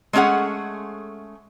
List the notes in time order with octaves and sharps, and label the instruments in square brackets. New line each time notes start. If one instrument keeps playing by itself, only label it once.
[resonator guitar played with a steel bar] G#3 A3 C#4 G#4 F#5